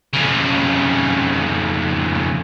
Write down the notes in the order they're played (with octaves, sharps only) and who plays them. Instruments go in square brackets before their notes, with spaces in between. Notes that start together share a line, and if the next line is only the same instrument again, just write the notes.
[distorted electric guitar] F2 C#3